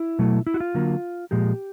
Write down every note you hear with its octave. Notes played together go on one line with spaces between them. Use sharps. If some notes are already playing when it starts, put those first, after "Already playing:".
Already playing: E4
B2 F#3 A3
E4
F#4
F4
D3 F#3 A#3
A#2 F3 G#3 G4